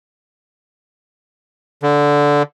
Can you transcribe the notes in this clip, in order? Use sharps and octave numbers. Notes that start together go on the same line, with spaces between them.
D3